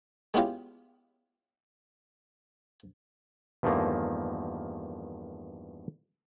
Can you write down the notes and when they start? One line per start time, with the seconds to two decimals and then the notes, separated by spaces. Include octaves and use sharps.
0.34 G#3 B3 C#4 E4 F4 G4
3.63 E2 G2 D#3 F3 A3 A#3